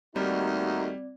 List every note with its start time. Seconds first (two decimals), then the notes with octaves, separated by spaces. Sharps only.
0.16 D#2 G3 A3 C4 D#4 F#4 D5